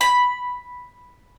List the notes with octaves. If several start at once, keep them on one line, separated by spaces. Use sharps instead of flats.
B5